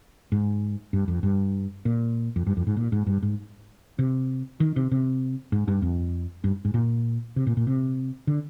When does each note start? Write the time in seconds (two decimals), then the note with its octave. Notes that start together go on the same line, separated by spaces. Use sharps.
0.32 G#2
0.93 G2
1.08 F2
1.23 G2
1.85 A#2
2.36 F2
2.47 G2
2.57 F2
2.67 G#2
2.77 A#2
2.92 G#2
3.07 G2
3.22 G#2
3.99 C3
4.60 D#3
4.76 C3
4.91 C3
5.52 G#2
5.68 G2
5.82 F2
6.44 G2
6.65 G#2
6.74 A#2
7.36 C3
7.47 A#2
7.57 A#2
7.67 C3
8.27 D3